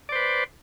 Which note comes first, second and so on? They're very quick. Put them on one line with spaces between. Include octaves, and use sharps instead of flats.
D5 C5 B4